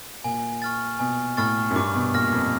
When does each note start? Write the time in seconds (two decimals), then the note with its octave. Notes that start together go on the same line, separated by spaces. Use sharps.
0.24 A#2 G#5
0.62 C#6 F6 A6
0.99 B2 G#5
1.37 A2 C#6 F6 A6
1.70 F#2
1.76 G2 D6
1.95 B2
2.14 A#2 F6 A#6
2.32 F2